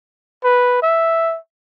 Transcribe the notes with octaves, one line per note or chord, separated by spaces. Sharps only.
B4
E5